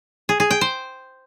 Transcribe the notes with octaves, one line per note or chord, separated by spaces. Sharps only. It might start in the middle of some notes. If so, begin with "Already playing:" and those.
G#4
G#4
G5
C5